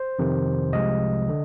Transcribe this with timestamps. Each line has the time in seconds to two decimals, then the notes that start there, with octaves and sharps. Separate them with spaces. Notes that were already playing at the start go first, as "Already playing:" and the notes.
Already playing: C5
0.19 F2 C3 D#3
0.72 C2 C3 F3 G#3 D#5
1.29 D3